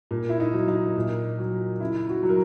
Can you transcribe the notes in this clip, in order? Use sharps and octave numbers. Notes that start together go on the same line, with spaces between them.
A#2
E4
D#4
F#3
D#4
A#2
F#3
C#3 E4
F#4
F#3
A#4